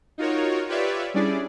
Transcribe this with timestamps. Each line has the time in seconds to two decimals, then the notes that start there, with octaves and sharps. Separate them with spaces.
0.18 D#4 F4 F#4 A#4 C#5
0.68 F4 G4 B4 C#5 D5 E5
1.14 G3 C#4 D4 E4 G#4 D5